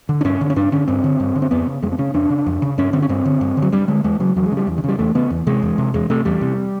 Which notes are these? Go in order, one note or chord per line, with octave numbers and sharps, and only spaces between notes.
D3
D4
G2 C#4
D3
C#4
G2 D4
D3 C#4
G2 C4
D3
G2
D3
C4
F2 B3
C#3
F2 G#3
C4
C#3 C#4
F2 D4
C#3
F2
C#3
G2 C#4
D3 C4
C#4
G2 C4
D3
G2
D3
F#3
G2 G3
D3 G#3
E2 G#3
C#3 F#3
E2 F#3
G#3
C#3
G3
E2
D3
C#3 G3
E2 A3
C#3 B3
E2
C3 G#3
E2
C3
E2 G#3
C3 A3
E2 G3
C3